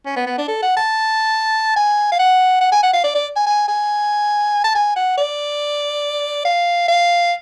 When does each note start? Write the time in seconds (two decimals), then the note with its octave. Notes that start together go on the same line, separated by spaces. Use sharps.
0.06 C#4
0.16 B3
0.26 B3
0.38 D4
0.48 A4
0.62 F#5
0.77 A5
1.76 G#5
2.12 F5
2.19 F#5
2.61 F#5
2.72 G#5
2.83 F#5
2.93 F5
3.04 D5
3.15 D5
3.36 G#5
3.46 G#5
3.68 G#5
4.64 A5
4.75 G#5
4.96 F#5
5.17 D5
6.45 F5
6.88 F5